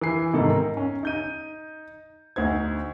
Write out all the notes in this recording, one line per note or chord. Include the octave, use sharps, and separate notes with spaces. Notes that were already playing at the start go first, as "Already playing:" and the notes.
E3 G#5 C7
G#2 C3 D#3 A4
A#4
C#4
D#4 G6 D#7
D2 D#4 C5 G#6